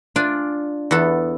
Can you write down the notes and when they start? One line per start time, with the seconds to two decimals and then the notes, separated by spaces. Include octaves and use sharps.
0.16 D4 F4 D5 G#5
0.91 E2 B3 A4